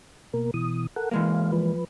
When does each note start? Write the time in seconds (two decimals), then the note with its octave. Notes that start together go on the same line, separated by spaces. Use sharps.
0.33 B2 A#3 A#4
0.54 B2 E3 D#6
0.96 A4 A#4 F#5
1.11 E3 G#3 A#3 F5
1.52 F3 B4